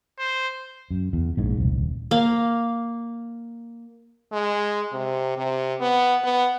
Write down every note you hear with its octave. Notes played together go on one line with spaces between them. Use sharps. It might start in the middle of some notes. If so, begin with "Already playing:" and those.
C5
F#2
E2
A#1 G#2
E1 C2
D#1
A#3 F5
G#3
C3
C3
B3
B3